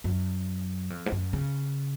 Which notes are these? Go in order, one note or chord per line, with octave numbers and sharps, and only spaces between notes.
F#2
F2
G#2
F#2
C#3